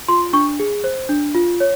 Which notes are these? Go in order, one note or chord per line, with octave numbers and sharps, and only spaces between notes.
F4 C6
D4 C#6
G#4
C5
D4
F4
C#5